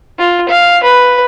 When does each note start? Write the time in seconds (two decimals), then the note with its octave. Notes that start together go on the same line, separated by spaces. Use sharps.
0.19 F4
0.49 F5
0.83 B4